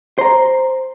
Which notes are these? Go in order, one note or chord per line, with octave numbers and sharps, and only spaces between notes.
C5 A#5